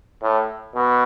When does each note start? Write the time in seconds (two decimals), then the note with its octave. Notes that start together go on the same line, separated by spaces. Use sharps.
0.22 A2
0.75 B2